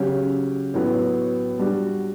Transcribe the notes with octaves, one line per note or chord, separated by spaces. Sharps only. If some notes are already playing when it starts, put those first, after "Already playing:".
Already playing: C#3 F#3 C#4 G4
A2 F#3 B3
G3 D4 F#4